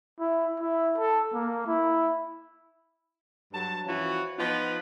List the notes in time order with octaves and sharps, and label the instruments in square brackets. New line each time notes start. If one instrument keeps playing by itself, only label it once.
[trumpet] E4
E4
A4
A#3
E4
[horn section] G2 F#3 A5
E3 F3 C#4 F4 F#4
F3 B3 D#4 F4 B4